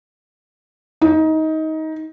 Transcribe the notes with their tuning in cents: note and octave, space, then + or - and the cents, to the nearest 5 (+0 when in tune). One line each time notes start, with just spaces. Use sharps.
D#4 +20